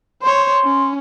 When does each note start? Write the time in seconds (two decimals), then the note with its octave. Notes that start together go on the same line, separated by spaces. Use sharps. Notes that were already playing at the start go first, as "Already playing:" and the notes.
0.22 C5 C#5 C6
0.64 C#4